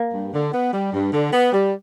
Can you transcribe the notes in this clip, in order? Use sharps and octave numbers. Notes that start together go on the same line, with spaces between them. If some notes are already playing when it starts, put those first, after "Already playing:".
Already playing: A#3
G2
D3
B3
G3
G2
D3
B3
G3